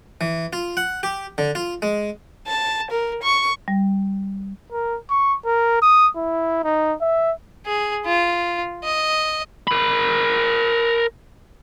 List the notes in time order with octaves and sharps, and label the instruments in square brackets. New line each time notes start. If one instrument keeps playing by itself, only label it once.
[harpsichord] E3
F4
F#5
G4
D3
F4
G#3
[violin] A5
A#4
C#6
[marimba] G3
[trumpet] A#4
C#6
A#4
D#6
E4
D#4
E5
[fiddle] G#4
F4
D#5
[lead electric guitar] A#4 B5